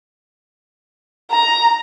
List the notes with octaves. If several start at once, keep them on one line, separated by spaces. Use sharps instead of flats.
A#5